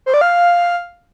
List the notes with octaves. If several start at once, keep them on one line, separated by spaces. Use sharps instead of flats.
C5
D5
F5